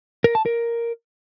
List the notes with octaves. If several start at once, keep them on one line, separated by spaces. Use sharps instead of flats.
A#4
A5
A#4